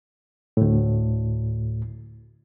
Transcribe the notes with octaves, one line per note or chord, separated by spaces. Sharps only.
D2 A2